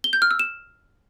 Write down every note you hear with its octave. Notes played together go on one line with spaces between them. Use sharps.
G7
G6
F6
E6
E7